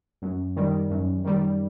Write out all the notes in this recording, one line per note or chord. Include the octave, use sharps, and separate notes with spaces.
F#2
D#3 G3
F#2
D#3 G3